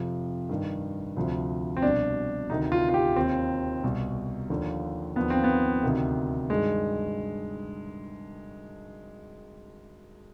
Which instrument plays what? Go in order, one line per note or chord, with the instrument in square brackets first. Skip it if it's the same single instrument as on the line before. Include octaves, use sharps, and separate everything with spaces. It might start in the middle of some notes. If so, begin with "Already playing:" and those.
Already playing: [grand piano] F2 C3 F3
G2 D#3
D2 C3 F3
C4
C2 B2 D4
D2 C3 D#3 D#4
F4
F4
G4
D#2 D#3 C4
C2 B2
D#2 D3 F3
D#2 D3 F3 B3
C4
B3
D2 C3 D#3
G2 D#3 G#3